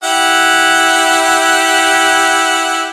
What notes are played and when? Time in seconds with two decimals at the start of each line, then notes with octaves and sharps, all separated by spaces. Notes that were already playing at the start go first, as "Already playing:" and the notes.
0.04 E4 G4 F#5